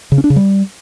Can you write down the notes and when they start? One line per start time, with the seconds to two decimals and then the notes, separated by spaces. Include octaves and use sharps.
0.12 C#3
0.18 C#4
0.24 D4
0.30 C#3
0.36 G3